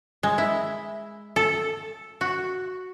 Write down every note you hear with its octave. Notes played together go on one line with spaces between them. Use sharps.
G#3
E4
A4
F#4